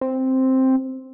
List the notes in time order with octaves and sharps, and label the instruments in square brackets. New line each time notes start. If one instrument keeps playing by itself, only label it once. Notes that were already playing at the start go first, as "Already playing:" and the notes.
[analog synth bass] C4